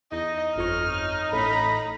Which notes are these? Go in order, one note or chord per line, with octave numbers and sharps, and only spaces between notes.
E2 D#4 D#5
G1 F2 C#5 F6
A1 A2 A3 A#5 B5